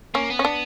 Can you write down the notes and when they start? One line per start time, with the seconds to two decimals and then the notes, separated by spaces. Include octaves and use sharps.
0.14 A#3 C#4
0.30 B3
0.39 C#4
0.45 D4